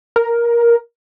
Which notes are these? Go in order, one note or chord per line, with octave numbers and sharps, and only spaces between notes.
A#4